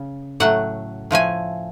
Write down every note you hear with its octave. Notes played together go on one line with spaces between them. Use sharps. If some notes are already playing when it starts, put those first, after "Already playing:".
Already playing: C#3
A2 F#3 A3 F#5
A2 F3 A3 G#5